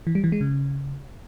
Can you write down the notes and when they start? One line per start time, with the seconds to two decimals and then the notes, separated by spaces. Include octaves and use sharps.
0.07 E3
0.15 G3
0.24 E3
0.32 G#3
0.41 C#3